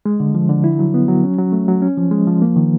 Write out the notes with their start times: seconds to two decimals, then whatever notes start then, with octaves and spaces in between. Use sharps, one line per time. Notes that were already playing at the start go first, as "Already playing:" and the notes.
0.06 G#3
0.20 D3
0.35 F3
0.49 D3
0.64 E4
0.79 F#3
0.94 B3
1.08 F#3
1.24 C#4
1.38 F#3
1.52 A3
1.68 F#3
1.82 C#4
1.98 F3
2.11 G#3
2.27 F3
2.42 A#3
2.56 D#3